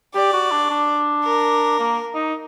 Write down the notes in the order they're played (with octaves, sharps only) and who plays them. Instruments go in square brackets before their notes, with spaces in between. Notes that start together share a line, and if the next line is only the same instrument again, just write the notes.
[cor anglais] G4 [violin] D5
[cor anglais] F#4
D4
D4
[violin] A#4
[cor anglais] A#3
D#4